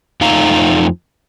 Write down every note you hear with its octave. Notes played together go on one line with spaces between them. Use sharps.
F2 F3 A3 D#4 F5 A#5